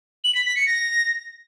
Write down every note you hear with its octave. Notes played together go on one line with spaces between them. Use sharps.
F#7
B6
B6
C#7
A#6